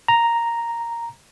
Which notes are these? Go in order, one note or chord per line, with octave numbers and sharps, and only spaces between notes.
A#5